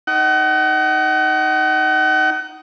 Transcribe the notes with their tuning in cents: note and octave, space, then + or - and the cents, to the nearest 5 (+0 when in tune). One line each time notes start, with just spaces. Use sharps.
D#4 +0 F#5 +35